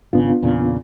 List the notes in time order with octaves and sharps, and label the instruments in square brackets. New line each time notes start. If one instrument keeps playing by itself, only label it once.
[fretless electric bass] G#1 C#3 [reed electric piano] B3 D4 F4
[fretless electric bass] E2 A#2 C#3